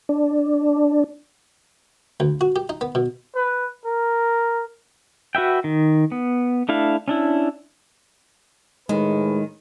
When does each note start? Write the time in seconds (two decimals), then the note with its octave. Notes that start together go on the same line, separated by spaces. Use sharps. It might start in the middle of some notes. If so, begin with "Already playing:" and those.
0.09 D4
2.20 D2
2.41 F#4
2.56 G4
2.69 D#4
2.81 B3
2.95 B2
3.36 B4
3.85 A#4
5.35 F#4 B4 E5 G5
5.64 D#3
6.12 B3
6.69 A3 D4 E4 F5
7.08 C#4 D4 E4
8.89 A2 D#3 G#3 G#4 B4